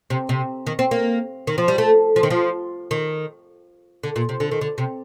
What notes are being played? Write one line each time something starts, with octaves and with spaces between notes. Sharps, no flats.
C3
C3
D#3
C4
A#3
D#3
F3
G3
A3
F3
D#3
F3
D#3
D3
A#2
C3
D3
D#3
D3
C3